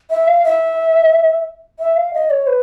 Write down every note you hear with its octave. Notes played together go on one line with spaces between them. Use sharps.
E5
F5
E5
E5
F5
D#5
C#5
B4